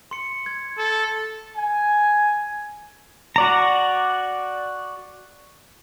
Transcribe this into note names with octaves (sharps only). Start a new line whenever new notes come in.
C6 C#7
G#6
A4
G#5
F#4 D5 A#5